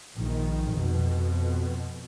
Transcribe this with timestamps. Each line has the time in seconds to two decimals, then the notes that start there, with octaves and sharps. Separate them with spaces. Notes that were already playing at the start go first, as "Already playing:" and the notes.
0.17 A#1 D#3
0.69 F2 B2